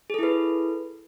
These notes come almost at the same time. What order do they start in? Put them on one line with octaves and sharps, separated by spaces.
G#4 A4 E4 B4